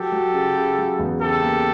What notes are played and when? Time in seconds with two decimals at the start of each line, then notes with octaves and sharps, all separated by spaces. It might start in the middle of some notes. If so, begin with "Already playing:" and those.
Already playing: F#3 G4 A4
0.12 F#3
0.33 C#3
0.56 C#3
0.78 F#3
0.99 E2
1.21 C#3 G4 A4
1.42 A#3